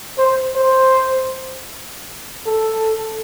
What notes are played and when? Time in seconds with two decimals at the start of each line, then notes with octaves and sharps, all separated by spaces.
0.18 C5
0.56 C5
2.46 A4